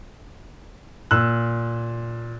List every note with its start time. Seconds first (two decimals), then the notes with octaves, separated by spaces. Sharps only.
1.11 A#2 E6 F#6